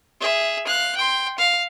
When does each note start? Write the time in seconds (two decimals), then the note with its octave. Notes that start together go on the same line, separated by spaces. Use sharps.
0.20 G#4 E5
0.67 F5 F#6
0.96 G5 C6
1.38 F5